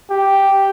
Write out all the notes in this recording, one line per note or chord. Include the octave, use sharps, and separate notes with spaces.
G4